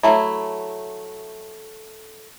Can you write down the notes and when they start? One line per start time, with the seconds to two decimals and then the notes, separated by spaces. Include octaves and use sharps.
0.03 F#3 A3 E4